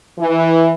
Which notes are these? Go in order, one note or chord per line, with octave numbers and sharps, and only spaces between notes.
E3